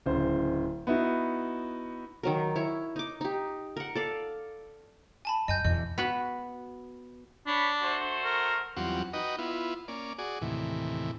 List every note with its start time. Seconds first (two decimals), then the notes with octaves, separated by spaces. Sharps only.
0.06 D1 C#3 C5
0.87 B3 D#4 E4 F#4
2.23 D#3 F#3 A#4
2.56 E4 C#5
2.96 D#4 D6
3.21 D#4 G4
3.77 A#4 F#5
3.95 A4 D5 F5
5.25 G#5 A5 B5
5.48 F#2 D#5 G#5 G6
5.65 E2 B2 D#5
5.98 B3 F#4 B5
7.47 D4 C#5 B5
7.82 A3 F#4 C5
8.25 A#4
8.77 E2 F#3 G3 C4 F4 F#5
9.13 D#4 F#4 B4 D#5 G5
9.38 B3 E4 F4
9.88 A#3 C#4 D5
10.18 F#4 G#4 D5
10.42 D#2 A2 C3 E3